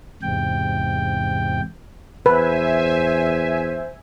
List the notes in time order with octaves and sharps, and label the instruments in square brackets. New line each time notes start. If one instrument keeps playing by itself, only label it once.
[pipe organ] E2 G#2 C3 G5
[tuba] E2 [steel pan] B4 [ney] C5 [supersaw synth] E5 G#5